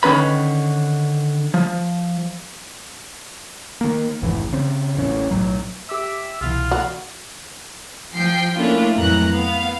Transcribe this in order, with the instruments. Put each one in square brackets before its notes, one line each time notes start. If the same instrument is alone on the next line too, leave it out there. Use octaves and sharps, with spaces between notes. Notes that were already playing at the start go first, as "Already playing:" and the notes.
[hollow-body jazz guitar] D3 D#3 C#4 B4 B5
F3
[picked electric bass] D#3 A#3
F1 A#1 G#2 E3
C#3 C4
D#1 A1 C#4
B1 A2 F#3
[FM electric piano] G4 D6 E6 [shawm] E5
[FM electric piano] C2 B2 E3 [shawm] F4
[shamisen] F#4
[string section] F3 G5 C7
A3 A#3 C#4 D4 E4 F4
F2 A2 E3 F#3 A#5 F#6
B3 F5